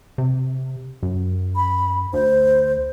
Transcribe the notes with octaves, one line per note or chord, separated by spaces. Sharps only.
C3
F#2
B5
D2 C5